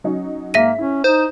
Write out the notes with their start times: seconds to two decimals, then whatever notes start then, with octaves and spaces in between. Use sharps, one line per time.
0.04 F#3 C#4 D#4
0.54 G#2 A#3 E5 A#6 B6 D#7
0.79 C#4 E4
1.04 D#4 C5